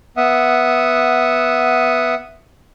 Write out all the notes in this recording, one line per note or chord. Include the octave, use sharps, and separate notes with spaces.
B3 E5 F#5 D#6